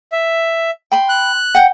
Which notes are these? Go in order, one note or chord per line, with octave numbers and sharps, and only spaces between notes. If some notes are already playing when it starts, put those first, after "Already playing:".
E5
G5 B5 C6
F#6
F#5 G5